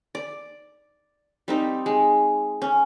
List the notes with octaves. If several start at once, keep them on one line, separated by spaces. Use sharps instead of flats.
D5
G3 C4 D#4
G#3
C#4